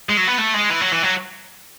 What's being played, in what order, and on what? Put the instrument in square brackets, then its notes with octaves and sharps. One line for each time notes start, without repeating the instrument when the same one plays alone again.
[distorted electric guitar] G#3
F#3
B3
A3
G#3
E3
F#3
E3
F#3